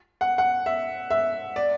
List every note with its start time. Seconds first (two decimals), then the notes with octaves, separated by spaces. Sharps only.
0.21 F#5
0.38 F#5
0.66 E5
1.10 E5
1.56 D5